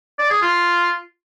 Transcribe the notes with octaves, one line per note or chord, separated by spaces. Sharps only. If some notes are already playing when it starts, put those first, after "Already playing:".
D5
G#4
F4